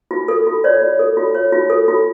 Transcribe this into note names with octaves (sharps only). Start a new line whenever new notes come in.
F4
A4
F4
C#5 D5
F4
A4
F4
C#5
F4
A4
F4